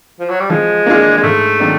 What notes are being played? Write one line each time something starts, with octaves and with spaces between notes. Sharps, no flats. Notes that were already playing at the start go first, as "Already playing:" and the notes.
F3
F#3
G3
F3 G#3
A#3 D4 F4 G#4
G#3
G#2 A3
D#3 F#3 A#3 D4